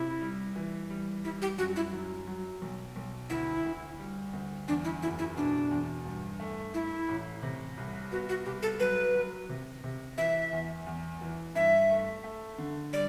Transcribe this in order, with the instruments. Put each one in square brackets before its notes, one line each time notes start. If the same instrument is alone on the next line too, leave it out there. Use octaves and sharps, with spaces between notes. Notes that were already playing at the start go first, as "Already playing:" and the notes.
Already playing: [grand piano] C3 [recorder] E4
[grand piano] G3
E3
G3
[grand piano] G3 [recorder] E4
[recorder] G4
[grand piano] F#2 [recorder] F#4
[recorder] E4
[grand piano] F#3
F#3
B1
B1
[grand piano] D2 [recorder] E4
[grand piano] D2
G3
D2
[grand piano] E2 [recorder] D4
[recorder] E4
[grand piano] F#1 [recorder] E4
[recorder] E4
[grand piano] B2 [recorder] D4
[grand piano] E2
G2
A3
[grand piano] A3 [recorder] E4
[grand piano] A1
C3
C2
[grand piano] B3 [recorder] F#4
[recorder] F#4
[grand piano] C2 [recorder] G4
[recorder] A4
[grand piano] F#3 [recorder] B4
[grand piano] F#3
C3
C3
[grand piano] E3 [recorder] E5
[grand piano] E2
E2
E3
[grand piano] G2 [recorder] E5
[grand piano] A3
A3
D3
[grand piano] G3 [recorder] D5